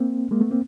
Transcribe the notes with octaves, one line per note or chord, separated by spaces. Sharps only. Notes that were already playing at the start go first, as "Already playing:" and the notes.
Already playing: A#3 C4
G#3 A#3
A3 B3
A#3 C4